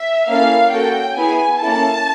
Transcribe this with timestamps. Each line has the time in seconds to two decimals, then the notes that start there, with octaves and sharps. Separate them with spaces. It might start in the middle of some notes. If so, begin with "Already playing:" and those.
Already playing: E5
0.28 A#3 C#4 E4 A4 F5
0.73 A#3 C#4 F#4 A4 G5
1.16 B3 E4 G#4 G#5
1.61 A#3 C#4 E4 A4 A5